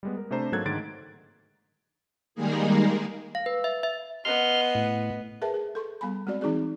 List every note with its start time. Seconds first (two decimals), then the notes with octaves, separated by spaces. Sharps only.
0.03 G3 G#3 B3
0.17 A#4
0.31 C3 A3 D4 C5 A#5
0.52 G#2 F#3 A#3 A4 F#6 G#6
0.65 G#2 D3 D#3 A6 D7
2.35 D#3 G3 G#3 A#3 D#4 G#4
3.35 F5
3.46 B4
3.64 E5
3.83 E5
4.25 B3 D#5 C6 F6
4.75 A2
5.42 G#4 A#4 B4 E5 G5 A5
5.54 G#4
5.75 A4 C6 C#6
6.01 G3 B3 G#5 B5
6.27 G#3 C4 F#4 D5
6.41 E3 C4 D#4 F#4 G#4 D5